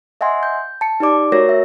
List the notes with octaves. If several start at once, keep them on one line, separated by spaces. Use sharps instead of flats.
D#5 E5 F#5 G#5 C6
G6
A5 C#7
D#4 G4 D5 D6
A3 F#4 A#4 C#5 A#6
E5